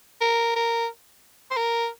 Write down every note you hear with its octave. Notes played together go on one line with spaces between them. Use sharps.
A#4
A#4
C5
A#4